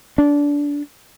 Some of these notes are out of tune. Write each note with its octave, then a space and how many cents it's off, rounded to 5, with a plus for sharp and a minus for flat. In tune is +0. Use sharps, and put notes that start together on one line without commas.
D4 -20